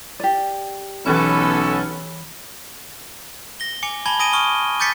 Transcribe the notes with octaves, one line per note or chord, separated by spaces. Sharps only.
G4 D5
B1 E3 B3 C#4 A4 C#5 B5
A#6 G7
G#5 D6 C#7 F7
G#5 A5 B5 G#6 C#7 G7
G#5 D#6 A#6 D7 D#7 G7
C#6 D#6 F6 C#7 G7
D6 G6 A6 B6 C#7